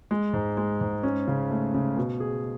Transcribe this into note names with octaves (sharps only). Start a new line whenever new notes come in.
G#3
G#2
G#3
G#2
C#4
C#3
A3
C#3
B2
G#4